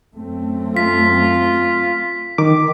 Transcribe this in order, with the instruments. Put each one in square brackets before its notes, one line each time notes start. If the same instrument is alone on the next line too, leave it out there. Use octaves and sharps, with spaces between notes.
[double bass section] F#2 A3 C4
[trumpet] F4 [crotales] B6
[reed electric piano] D#3 D6